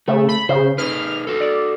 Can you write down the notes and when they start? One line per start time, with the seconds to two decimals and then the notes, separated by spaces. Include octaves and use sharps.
0.08 C#3 A3
0.29 B5
0.49 C#3 C5
0.78 D#4 G#4 B4 F6
1.27 F#4 A4
1.40 D5